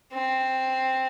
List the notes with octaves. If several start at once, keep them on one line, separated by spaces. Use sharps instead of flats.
C4